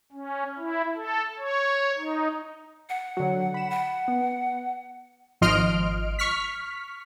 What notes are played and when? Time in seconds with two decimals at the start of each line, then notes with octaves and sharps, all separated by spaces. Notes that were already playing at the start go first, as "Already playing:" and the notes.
0.12 C#4
0.58 E4
0.95 A4
1.39 C#5
1.98 D#4
2.89 F#5
3.17 D3 F#3
3.54 B5 E7
3.71 F#5
4.08 B3
5.41 G#1 F3 D#5 C6 F6 D7
6.19 C#6 F6 B6